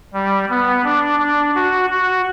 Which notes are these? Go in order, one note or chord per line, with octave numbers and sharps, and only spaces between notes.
G3
B3
D4
D4
F#4
F#4